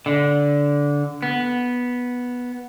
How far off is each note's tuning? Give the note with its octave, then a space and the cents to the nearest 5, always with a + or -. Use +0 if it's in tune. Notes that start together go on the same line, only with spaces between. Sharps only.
D3 -15
B3 -5